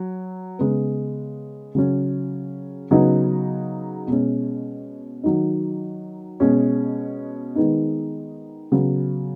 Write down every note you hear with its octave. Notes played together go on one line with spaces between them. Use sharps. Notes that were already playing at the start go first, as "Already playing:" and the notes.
Already playing: F#3
C#3 G#3 B3
C#3 F#3 C#4
C#3 F#3 B3 D#4
B2 G#3 C#4
D#3 F#3 D#4
B2 G#3 C#4
D#3 G#3 B3 D#4
C#3 F#3 B3